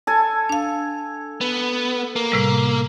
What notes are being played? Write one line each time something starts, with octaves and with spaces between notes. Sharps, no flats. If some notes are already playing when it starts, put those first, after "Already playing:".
A4 G#5
D4 F5
B3
A#3
A2 C3 G3